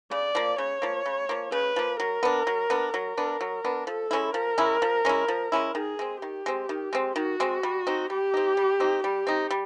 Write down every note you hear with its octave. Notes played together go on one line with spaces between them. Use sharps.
C#3 D5
F3 A#3
C#3 C#5
F3 A#3
C#3
F3 A#3
C#3 B4
F3 A#3
F#3 A#4
B3 D4
F#3
B3 D4
F#3 A#4
B3 D4
F#3
B3 D4
F3 A4
G#3 C#4 E4
F3 A#4
G#3 C#4 E4
F3
G#3 C#4 E4
F3
G#3 C#4 E4
D#3 G#4
G#3 C4
D#3 G4
G#3 C4
D#3
G#3 C4
D#3 F#4
G#3 C4
G3
C4 D#4
G3 G4
C4 D#4
G3
C4 D#4
G3 G4
C4 D#4
G3